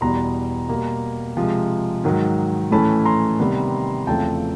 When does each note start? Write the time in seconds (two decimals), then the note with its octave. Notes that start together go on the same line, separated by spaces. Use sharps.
0.01 E2 B2 G3 B3 A#5 C6
0.69 B2 G3 A#3
1.37 C3 F3 G#3
2.04 G#2 D#3 F#3
2.71 A2 E3 A3 C#4 A5 B5
3.05 A#5 C6
3.39 C3 D#3 G3 B3
4.07 E2 C#3 F3 A3 C4 G5 A5